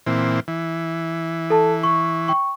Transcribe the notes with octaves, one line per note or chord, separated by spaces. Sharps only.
A#2 E3 C4
E3
A4 A5
C#6
G5 C#6